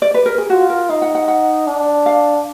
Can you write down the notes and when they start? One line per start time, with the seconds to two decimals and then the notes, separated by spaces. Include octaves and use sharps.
0.02 D5
0.14 B4
0.26 A#4
0.38 G#4
0.50 F4 F#4
0.70 A#4
0.90 D#4 F5
1.02 F#5
1.15 F#5
1.28 F#5
1.67 D4
2.06 F5